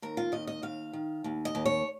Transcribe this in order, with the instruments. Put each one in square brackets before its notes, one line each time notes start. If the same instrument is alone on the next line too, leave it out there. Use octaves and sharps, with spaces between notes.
[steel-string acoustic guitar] D#2 A#4
F4
D#2 D#5
D#5
D#2 F5
D#3
D#2
D#5
D#2
C#5